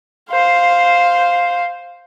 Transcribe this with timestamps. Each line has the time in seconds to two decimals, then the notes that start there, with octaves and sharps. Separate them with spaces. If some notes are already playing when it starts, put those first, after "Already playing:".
0.31 C5 F5